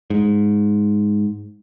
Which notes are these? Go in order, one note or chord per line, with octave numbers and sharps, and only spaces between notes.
G#2